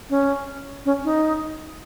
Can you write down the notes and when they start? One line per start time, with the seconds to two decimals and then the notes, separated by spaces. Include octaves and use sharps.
0.10 C#4
0.85 C#4
1.04 D#4